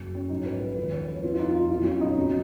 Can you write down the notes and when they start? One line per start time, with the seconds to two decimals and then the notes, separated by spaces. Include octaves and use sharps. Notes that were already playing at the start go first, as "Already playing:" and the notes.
Already playing: F#1 F#2 C#3 F#3
0.15 C#4
0.30 A#1 G#2 F#3 D#4
0.46 B4
0.61 B4
0.76 D#2 C#3 F3 B4
0.92 C#5
1.08 B4
1.23 F2 F3 F4
1.34 F4
1.39 D#4
1.54 F4
1.70 B1 A#2 F#3 F4
1.85 C#4
2.01 D#4
2.16 F2 C#3 F#3